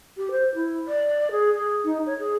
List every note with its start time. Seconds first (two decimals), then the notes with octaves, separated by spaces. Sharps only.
0.17 G4
0.30 C5
0.55 E4
0.87 D5
1.30 G#4
1.53 G#4
1.84 D#4
2.06 C#5
2.18 G#4